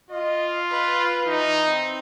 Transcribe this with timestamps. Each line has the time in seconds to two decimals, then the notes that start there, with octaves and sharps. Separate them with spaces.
0.11 F4 D#5
0.71 B4
1.26 E3 D#4
1.67 C4